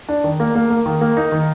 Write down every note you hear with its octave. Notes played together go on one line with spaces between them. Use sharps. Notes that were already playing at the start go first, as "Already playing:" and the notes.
D4
D#3
A#3
A#3
A#3
D#3
A#3
D#4
D#3